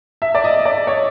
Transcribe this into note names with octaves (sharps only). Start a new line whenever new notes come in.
E5
D5
D#5
D5
C#5